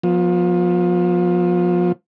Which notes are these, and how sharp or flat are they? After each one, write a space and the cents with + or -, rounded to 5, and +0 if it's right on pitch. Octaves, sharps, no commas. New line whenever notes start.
F3 +25 B3 -20